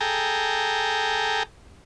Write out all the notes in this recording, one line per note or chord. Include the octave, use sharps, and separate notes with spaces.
G#4 A4 G5 A#5